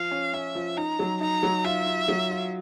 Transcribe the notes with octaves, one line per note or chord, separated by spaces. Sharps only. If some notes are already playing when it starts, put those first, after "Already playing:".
Already playing: F3 F5
C#4
C#4 E5
F3
D#4 A#5
F#3
D#4 A#5
F#3
F4 E5
F4
F#3
F4